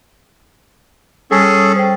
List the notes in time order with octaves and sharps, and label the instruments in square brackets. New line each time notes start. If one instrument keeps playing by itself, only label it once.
[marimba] G3 [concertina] C#4 G#4 A4
[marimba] C5 G5